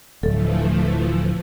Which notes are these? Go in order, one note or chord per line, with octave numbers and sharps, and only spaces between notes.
D1 E3 F3 A3 A4